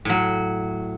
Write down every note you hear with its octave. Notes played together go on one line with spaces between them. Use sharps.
A2 F#3